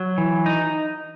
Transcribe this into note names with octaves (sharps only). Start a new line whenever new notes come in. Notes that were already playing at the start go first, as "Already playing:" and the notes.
Already playing: F#3
E3
D#4